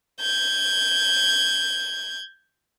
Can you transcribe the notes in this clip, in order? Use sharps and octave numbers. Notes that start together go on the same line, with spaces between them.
G6 G#6